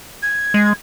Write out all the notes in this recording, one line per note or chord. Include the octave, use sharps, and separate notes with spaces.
G#6
G#3